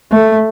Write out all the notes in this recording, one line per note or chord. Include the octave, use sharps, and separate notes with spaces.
A3